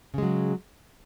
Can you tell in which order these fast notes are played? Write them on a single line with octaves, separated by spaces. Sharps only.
C#3 G#3 F#3